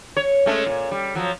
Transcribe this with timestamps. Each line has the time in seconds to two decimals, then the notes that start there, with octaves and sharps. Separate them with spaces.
0.17 C#5
0.46 G#3 A3 C#4
0.66 A#2
0.91 G3
1.15 F3 F#3